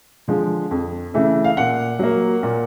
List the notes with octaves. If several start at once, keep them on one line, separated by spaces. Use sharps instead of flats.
D3 F3 G#3
F2
C#3 E3 A3
F5
A#2 F#5
F#3 A#3
A#2